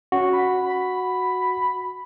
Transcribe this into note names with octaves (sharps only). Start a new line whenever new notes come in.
C#4 F#4
B5
B5